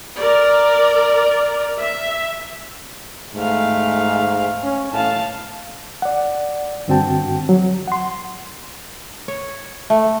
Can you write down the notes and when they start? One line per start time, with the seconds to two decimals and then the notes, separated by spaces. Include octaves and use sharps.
0.19 A#4 D5
1.79 E5
3.35 G#2 A3 F5
4.63 C#4
4.93 A2 F5 A5
6.02 D5 F#5
6.88 G2 D3 C4 F#4 G5 A5
7.49 F#3
7.87 F#5 C6
9.28 C#5
9.90 A3